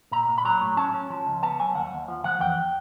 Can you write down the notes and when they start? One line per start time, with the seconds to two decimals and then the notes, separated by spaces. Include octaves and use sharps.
0.11 A#2 A#5
0.28 A#2
0.38 B5
0.45 F#3 A#5
0.61 A2
0.77 C#4 A5
0.94 C#4
1.10 F3
1.27 C#2
1.43 B3 A5
1.60 F#3 G#5
1.75 D#2 F#5
1.92 D#2
2.08 F3
2.24 F3 F#5
2.40 E2 G5